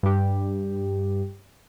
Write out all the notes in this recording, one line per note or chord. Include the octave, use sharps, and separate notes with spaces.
G2 G4